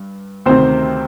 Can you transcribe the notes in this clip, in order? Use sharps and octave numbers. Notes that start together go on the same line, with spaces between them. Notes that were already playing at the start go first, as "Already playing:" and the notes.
Already playing: G2
D2 C3 D#3 C4 C5